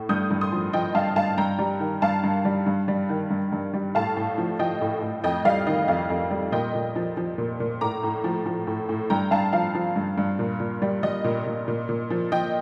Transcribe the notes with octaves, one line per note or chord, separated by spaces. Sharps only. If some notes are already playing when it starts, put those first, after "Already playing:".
Already playing: A2
G2 D#6 G6
G2
C6 D#6
F3
F3 D#5 G5
G2 F5 A5
G2 F5 A5
G2 G5 A#5
G3
D#3
G2 F5 A5
G2
G3
G2
G3
D#3
G2
G2
G3
A2 F5 A5
A2
F3
F3 D#5 G5
A2
A2
F2 D#5 G5
G3 F5
D#3 D#5
F2 F5
F2
G3
A#2 D#5 G5
A#2
F3
F3
A#2
A#2
A2 A#5 D6
A2
F3
F3
A2
A2
G2 G5 A#5
G2 F5 A5
F3 F5
F3
G2
G2
A#2
A#2
G3
G3 D#5
A#2
A#2
A#2
A#2
F3
F3 D#5 G5